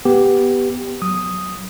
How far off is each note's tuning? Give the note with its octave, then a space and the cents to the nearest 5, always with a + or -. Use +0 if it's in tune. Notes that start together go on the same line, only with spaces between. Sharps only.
B3 +0 G4 +0
F#3 +0 D#6 +0